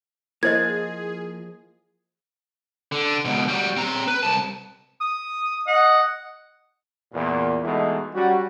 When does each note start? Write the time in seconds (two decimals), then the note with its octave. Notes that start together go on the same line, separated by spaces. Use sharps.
0.43 F3 A#3 E4 G#4 C5 D#5 G#6
2.92 D3
3.25 C#2 B2
3.48 G3 F#4
3.77 C4 A#5
4.08 B4
4.23 C2 A5
5.01 D#6
5.67 D#5 F#5
7.13 E2 A#2
7.63 B2 E3 G#3 A3 D#4 E4
8.14 F#3 G3 C#4 F#4